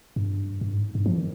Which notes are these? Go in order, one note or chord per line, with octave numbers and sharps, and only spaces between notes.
G2
G2
G#2
G2
F3
D#3